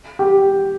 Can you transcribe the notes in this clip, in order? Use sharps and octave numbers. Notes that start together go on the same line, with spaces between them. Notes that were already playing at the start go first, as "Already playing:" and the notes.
G4